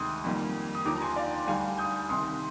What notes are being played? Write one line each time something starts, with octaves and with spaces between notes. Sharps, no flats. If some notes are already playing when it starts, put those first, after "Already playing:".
Already playing: D2 C3 D#3 G#3 C6 D#6
F2 D#3 G3 A#3
D#6
D#2 D3 F3 A#5 D6
A#5
G#5 C6
D5 F5
D2 D3 G3 F5 G#5
D#6 G6
C2 C3 D#3 C6 D#6